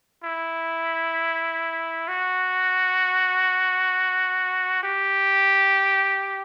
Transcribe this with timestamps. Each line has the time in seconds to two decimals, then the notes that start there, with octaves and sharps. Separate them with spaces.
0.24 E4
2.08 F#4
4.83 G4